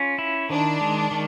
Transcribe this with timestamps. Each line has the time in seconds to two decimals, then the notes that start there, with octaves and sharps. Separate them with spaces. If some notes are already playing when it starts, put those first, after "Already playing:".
Already playing: C#4 F4
0.18 E4
0.50 D#3 D4
0.81 G#3
1.11 D#3